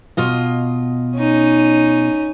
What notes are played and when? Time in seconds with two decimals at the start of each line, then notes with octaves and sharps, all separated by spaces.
0.17 B2 F4 D#5
1.16 C#4 D#4